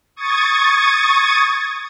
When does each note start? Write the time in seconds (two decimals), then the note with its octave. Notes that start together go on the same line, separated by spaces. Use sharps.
0.15 C#6 D#6 G#6 A6